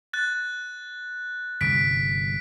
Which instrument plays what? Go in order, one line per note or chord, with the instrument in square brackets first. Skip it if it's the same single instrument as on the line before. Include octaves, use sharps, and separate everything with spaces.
[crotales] F#6 A6
[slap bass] G1 C2 [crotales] B6 D7